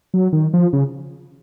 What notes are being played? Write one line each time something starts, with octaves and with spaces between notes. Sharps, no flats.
F#3
D#3
F3
C#3